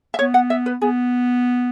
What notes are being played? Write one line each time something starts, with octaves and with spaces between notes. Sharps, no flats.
E5
B3 C#5
F#5
E5
B4
B3 G#4